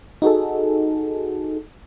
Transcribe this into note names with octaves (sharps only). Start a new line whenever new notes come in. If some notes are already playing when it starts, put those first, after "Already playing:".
D#4 F#4 G#4 A4